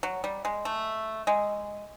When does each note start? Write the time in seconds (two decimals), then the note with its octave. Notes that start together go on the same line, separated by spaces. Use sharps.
0.03 F#3
0.24 G3
0.45 G#3
0.65 A3
1.27 G#3